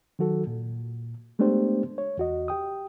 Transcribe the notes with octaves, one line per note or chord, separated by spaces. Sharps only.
D#3 F#3 F#4 A4
A#2
G#3 A3 B3 D4 G4 C5
C#5
E2 F#4 D#5
G4 G5 D#6